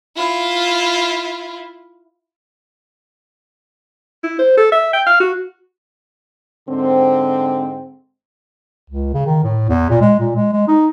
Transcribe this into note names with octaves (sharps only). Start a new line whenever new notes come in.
E4 F4
E4
C5
A4
E5
G5
F5
F#4
G#2 D3 C4
C#2
C#3
D#3
A2
E2
A#2
G#3
A#2
G#3
G#3
D#4